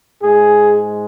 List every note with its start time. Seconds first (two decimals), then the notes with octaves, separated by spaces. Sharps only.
0.23 G#2 G#3 G#4